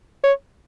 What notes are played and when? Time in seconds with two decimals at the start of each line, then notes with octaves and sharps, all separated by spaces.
0.24 C#5